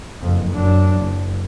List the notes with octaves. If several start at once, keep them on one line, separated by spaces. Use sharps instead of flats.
F#1 F2
F#2 D4
F#1